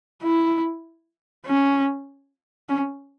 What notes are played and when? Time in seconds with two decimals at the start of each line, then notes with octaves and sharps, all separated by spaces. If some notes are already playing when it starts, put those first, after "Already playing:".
0.23 E4
1.46 C#4
2.69 C#4